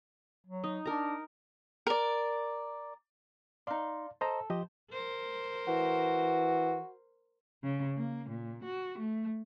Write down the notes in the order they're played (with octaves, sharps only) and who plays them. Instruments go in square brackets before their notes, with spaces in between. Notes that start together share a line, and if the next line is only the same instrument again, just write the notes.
[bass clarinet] F#3
[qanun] D#4
[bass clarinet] D4 [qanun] A#4 A#5
[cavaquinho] A#4 D5
[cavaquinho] D#4 C6 [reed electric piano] D5 F5
[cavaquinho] A4 [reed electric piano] C5 D#5 A#5
[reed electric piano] F3 G4 D#5 [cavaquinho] C5
[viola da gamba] A#4 C5
[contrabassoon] E3 [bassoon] F#4
[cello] C#3
A#3
A#2
F#4
A3